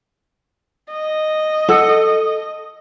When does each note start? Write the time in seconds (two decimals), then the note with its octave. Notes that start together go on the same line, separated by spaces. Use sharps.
0.92 D#5
1.69 A4 F#5